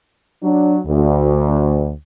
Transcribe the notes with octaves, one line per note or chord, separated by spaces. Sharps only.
F#3 D4
D2